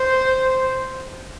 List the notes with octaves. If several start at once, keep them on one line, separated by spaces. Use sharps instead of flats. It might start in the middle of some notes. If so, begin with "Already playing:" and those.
Already playing: C5